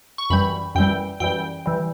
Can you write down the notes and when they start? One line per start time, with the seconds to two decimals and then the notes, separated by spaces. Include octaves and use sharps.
0.18 C#6
0.30 F#2 E3 G3 B5
0.75 F#2 E3 G3 G5
1.20 F#2 E3 G3 G5
1.66 E3 G3